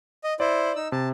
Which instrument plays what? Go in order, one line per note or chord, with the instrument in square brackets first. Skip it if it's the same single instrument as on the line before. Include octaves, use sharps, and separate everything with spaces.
[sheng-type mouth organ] D#5
[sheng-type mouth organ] E4 C5 [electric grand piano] D5
[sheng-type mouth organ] D#4 E6
[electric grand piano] C3 [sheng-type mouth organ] A5